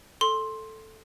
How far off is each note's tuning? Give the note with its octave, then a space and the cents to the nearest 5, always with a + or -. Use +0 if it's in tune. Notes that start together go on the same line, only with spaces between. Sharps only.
A4 +0 C6 +10